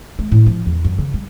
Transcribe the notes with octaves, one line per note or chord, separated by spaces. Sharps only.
G#3
A2
F3
E2
F#2
C#3
G3